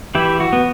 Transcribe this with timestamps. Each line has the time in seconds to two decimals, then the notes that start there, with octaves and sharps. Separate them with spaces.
0.15 E3 E4 G4
0.40 F#4
0.53 B3